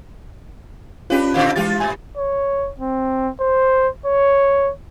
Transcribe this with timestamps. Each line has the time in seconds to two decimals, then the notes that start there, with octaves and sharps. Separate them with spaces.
1.10 C#4 D4 F4 G4 B4
1.34 A2 D3 C4
1.56 E3 G#3 F4 G4 A6
1.80 G#2 G#5 A6
2.17 C#5
2.80 C4
3.40 C5
4.06 C#5